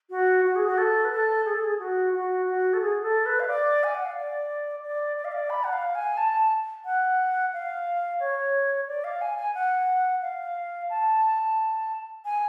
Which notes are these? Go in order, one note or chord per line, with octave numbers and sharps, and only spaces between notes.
F#4
F#4
G#4
F#4
A4
B4
A4
G#4
A4
G#4
F#4
F#4
F#4
A4
G#4
A4
B4
F5
D5
G#5
F#5
F5
D5
D5
D5
F5
D5
B5
F#5
F5
G#5
A5
F#5
F5
C#5
D5
F5
G#5
G#5
F#5
F5
A5
G#5